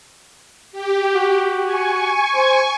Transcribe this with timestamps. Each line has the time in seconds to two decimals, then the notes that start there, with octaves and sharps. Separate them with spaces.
0.72 G4
1.14 F#4
1.63 G#5 C#6
2.35 C5